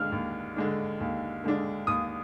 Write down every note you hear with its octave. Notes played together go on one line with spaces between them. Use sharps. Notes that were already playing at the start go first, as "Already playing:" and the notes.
Already playing: D#2 D3 G#3 D4 F6
D#2
D3 G#3 D4
D#2
D3 G#3 D4
D#2 D#6